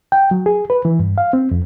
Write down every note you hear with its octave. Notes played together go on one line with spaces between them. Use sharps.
G5
F#3
G#4
B4
E3
G2
F5
C4
F2